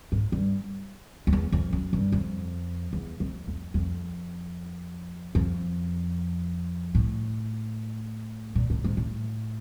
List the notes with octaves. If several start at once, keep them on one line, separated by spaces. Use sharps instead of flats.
G#2
G2
F2
E2
F2
F#2
G2
F2
E2
F2
F2
F2
F2
A2
A#2
A2
G#2
A2